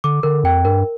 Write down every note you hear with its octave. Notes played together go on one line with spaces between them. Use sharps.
D3 D6
D3 A#4
F2 G5
G2 A#4